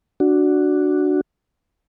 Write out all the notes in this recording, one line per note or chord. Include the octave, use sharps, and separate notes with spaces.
D4 F#4